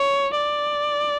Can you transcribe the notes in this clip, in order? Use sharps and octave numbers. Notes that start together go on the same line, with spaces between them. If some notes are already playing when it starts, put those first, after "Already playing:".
Already playing: C#5
D5